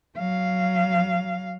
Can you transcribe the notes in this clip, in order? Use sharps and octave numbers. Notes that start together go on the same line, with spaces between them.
F#3 F5